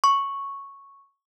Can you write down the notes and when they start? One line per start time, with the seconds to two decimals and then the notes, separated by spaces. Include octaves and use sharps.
0.04 C#6